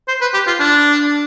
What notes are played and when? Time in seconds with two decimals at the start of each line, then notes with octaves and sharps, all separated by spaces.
0.08 C5
0.21 B4
0.34 G4
0.47 F4
0.60 D4